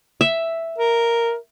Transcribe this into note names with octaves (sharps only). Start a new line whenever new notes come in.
E5
A#4